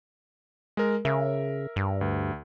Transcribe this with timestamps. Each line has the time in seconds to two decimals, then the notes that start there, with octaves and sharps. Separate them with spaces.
0.77 G#3 A#4
1.05 C#3 A#4 E5
1.76 G2
2.01 D2